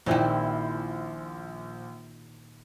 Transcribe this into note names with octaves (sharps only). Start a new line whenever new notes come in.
A#1 A#2 D#3 C4 E4 G4 C5